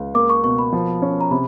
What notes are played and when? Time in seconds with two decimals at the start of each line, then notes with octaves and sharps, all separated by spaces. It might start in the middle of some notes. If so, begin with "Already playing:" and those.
Already playing: C#2
0.14 A#3 D6
0.30 C#6
0.43 B2 C#6
0.59 B5
0.72 F3
1.02 C#4
1.21 A#5
1.31 C3 B5